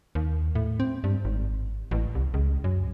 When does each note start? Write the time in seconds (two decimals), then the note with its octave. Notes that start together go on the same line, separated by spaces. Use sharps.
0.15 D#2
0.55 A2
0.80 C4
1.04 G2
1.25 G#1
1.91 A1
2.15 C2
2.34 C#2
2.64 F#2